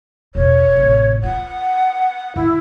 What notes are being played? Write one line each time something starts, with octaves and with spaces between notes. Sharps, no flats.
E1 B1 C#5
A1 C3
F4 F#5
D3 E4